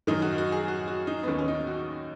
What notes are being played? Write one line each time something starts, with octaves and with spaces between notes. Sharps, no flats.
F#2 D#3 D#4
F#4
F#4
G#4
F#4
F#4
D#4
B3
D#2 D#3 C#4
C#4
D#4
F#4